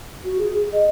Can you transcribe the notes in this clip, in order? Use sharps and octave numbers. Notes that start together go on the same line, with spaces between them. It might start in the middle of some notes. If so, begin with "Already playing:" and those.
F#4
G#4
G#4
D#5